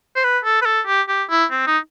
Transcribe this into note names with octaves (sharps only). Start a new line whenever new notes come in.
C5
B4
A4
B4
A4
G4
G4
E4
C4
D#4